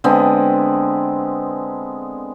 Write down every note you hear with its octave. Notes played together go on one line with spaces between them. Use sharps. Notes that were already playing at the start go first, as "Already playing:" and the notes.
D3 G#3 B3 C4